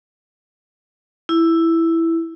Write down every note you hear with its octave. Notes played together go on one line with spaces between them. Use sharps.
E4